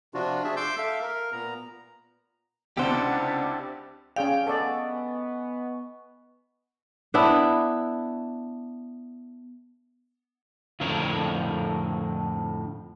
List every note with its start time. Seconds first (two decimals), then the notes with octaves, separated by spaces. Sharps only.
0.14 C3 F3 D4 F4 F#4
0.44 D4 G#4 E5 A5
0.56 C6 D6 E6 G6
0.78 A4 E5 F5
1.02 A#4
1.32 A#2 B3 A#5
2.77 C#2 C3 D4 E4 G4 C5 F#5
4.16 C#4 G#4 D5 F5 G5 G#5
4.47 B3 A4 D5 D#5 G#5 C#6
7.14 B3 D4 E4
10.80 F2 A2 D3 C4 A#4 C#5